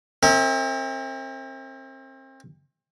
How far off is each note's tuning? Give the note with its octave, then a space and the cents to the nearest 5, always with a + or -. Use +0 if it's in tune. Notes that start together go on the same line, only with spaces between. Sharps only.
C4 +35 A#4 -35 E5 -40